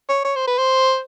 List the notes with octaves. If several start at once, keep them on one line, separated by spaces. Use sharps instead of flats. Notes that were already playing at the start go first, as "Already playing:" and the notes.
C#5
C#5
C5
B4
C5